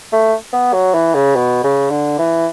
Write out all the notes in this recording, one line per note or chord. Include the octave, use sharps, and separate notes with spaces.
A3
B3
F#3
E3
C#3
B2
C#3
D3
E3